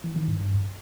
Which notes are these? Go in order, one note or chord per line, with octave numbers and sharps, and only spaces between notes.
E3
D#3
G2